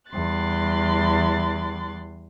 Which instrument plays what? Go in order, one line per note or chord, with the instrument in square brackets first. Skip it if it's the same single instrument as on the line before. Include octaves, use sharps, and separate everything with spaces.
[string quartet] E2 G3 C6 F#6 A6